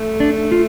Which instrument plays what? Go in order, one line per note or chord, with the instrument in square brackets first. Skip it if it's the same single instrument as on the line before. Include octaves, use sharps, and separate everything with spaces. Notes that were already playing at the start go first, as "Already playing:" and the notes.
Already playing: [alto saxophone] A3
[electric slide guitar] D4
F4